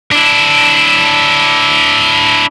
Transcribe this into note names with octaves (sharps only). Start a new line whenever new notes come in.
D4 E4